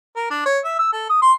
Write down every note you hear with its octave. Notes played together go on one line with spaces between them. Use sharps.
A#4
D4
C#5
E5
E6
A4
D#6
C6